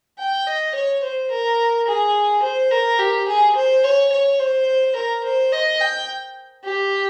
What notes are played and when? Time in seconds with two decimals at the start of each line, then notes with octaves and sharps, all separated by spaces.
0.19 G5
0.47 D#5
0.75 C#5
1.03 C5
1.31 A#4
1.87 G#4
2.43 C5
2.71 A#4
2.99 G4
3.28 G#4
3.56 C5
3.84 C#5
4.12 C#5
4.39 C5
4.96 A#4
5.24 C5
5.53 D#5
5.81 G5
6.64 G4